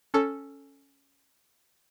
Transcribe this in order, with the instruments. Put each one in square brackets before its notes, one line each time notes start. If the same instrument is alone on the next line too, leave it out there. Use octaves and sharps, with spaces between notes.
[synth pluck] C#4 A4